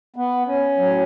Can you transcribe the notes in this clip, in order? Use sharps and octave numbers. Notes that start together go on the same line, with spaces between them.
B3
C#4
A2 F#3